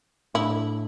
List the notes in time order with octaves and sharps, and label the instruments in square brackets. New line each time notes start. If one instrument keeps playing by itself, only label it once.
[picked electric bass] A2 A3 D4 [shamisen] E4